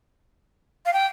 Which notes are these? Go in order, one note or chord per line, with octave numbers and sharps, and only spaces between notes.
F5
G5